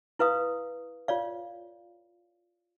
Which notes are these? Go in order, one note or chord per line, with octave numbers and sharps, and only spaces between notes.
E4 B4 F5 D#6
F4 C#5 D5 F5